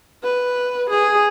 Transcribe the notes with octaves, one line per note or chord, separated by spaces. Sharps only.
B4
G#4